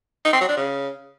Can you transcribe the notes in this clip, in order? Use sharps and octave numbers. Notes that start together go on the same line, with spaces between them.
D#4
C4
F#3
D4
C#3